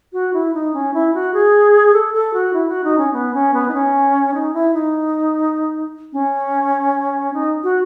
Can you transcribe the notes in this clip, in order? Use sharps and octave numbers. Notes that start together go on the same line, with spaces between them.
F#4
E4
D#4
C#4
E4
F#4
G#4
A4
A4
F#4
E4
F#4
D#4
C#4
B3
C#4
B3
D#4
C#4
D#4
E4
D#4
C#4
D#4
F#4